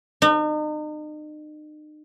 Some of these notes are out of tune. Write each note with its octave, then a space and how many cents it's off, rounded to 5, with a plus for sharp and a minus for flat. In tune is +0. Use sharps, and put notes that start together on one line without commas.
D#4 -40